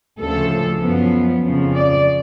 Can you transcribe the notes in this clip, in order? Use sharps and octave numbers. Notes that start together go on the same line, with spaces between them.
D2 C#3 F3 A4
F#2 F3 B3
F2 C#3 F3
D5